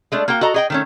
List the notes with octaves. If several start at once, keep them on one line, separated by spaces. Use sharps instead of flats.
G#3 A3 D4
A#3 F#4 F5 G5
F#4 A4 D#5 A#5
G#4 D#5 G5
D#3 A3 C#4